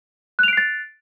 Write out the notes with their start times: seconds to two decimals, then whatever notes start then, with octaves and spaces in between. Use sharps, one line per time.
0.39 F#6
0.43 F7
0.48 D7
0.53 C7
0.57 A6